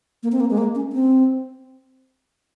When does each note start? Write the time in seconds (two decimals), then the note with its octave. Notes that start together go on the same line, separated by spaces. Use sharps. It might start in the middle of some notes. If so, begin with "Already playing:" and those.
0.23 A#3
0.32 C4
0.40 A#3
0.50 G#3
0.58 A#3
0.75 C#4
0.93 C4